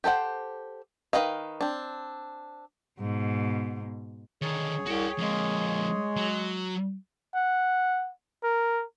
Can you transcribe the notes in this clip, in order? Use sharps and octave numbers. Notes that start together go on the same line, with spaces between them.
G4 A4 C5 F#5
D#3 G#4 B4 D#5 F5
C4 D4
G#2 B2
D3 D#3 G#4 C#5
C2 F#4 G5
F2 G#3 A#3
F#3
F#5
A#4